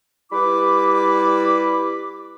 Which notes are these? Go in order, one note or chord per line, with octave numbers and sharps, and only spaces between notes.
G3 E4 B4 B5 D6